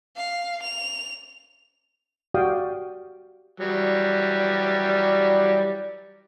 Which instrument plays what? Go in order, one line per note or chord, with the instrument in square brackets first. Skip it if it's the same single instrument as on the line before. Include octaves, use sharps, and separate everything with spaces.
[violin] F5
F7
[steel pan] F#4 G4 D5 F5 G5 D#6
[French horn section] E3 B4 D5 [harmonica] F#3 G3